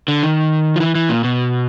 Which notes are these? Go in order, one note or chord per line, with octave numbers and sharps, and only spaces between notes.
D3
D#3
F3
E3
E3
A#2
B2